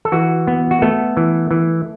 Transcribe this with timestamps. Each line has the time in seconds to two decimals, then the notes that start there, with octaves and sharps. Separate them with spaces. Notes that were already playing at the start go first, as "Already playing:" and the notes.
0.05 A4
0.12 E3 F#4
0.47 B3
0.71 F#4
0.82 A3 B3 A4
1.17 E3
1.51 E3